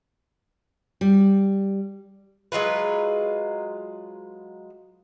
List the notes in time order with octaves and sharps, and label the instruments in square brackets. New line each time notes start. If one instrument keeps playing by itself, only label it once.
[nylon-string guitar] G3
[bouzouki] F#3 G#3 F4 B4